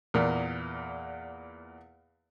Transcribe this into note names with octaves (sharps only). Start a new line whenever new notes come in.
E2 A#2 A#4